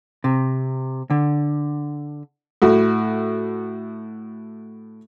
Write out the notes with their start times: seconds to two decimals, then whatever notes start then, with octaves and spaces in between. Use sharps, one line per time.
0.24 C3
1.10 D3
2.62 A2 F#4